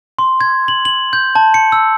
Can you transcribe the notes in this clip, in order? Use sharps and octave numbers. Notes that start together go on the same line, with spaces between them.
C6
G#6
F#7
F#7
G6
A5
C#7
E6